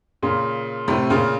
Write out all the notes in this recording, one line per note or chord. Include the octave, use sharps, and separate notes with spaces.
A#2 C#3
A2 C3
A#2 C#3